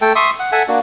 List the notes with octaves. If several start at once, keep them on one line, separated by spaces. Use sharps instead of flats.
A3 A4 G5
E5 C6 C#6 D#6
F#5
A4 E5 F#5 G#5
A#3 D4 F#4